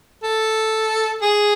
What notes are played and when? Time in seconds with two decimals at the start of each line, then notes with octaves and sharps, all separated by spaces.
0.23 A4
1.22 G#4